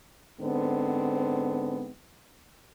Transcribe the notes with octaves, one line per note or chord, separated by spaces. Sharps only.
G#2 D3 B3 C4